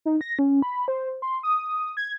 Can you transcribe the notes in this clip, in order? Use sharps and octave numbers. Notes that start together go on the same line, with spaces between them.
D#4
A#6
C#4
B5
C5
C6
D#6
G#6